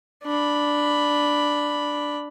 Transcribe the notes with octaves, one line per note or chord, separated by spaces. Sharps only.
D4 B5